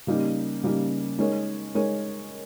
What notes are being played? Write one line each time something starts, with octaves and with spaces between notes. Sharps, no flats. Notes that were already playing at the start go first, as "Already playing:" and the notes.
C#3 G3 A#3 D#4
C#3 G3 A#3 D#4
G#3 D#4 A#4 C#5
G#3 D#4 A#4 C#5